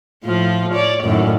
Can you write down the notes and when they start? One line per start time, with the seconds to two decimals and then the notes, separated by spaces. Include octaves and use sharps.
0.24 A2 F3 F4
0.74 C#5 D5
1.04 F#2 A2 D#3